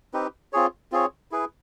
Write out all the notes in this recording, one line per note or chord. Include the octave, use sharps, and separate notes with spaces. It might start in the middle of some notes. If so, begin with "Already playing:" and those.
C4 D#4 G4 B4
C4 F4 G#4 C#5
C4 F4 G#4 C#5
E4 G#4 B4